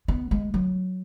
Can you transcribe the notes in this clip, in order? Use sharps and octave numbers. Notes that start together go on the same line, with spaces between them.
B3
G#3
F#3